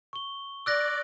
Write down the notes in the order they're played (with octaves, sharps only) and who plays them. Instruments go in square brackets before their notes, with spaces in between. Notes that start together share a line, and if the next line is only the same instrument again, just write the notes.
[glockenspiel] C#6 G7
[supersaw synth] D5 [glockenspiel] E6 F#6 A#6